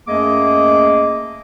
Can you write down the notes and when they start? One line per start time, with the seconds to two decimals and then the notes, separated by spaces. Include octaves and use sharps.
0.08 F#2 A3 A#3 G#4 D#5 D6